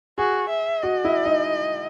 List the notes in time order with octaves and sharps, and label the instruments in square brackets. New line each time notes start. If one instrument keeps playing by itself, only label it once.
[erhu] F#4 [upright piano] G#4
[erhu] E5
[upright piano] F#4 [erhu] D#5
[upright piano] E4
D#4